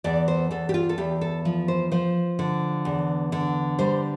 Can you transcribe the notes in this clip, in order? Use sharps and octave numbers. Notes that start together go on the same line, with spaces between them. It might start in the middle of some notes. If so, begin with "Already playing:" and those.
E2 D5
C5
E2 A4
G4
F4
A4
E2 G4
A4
F3
C5
F3 C5
D3
E2
D3
G3 C5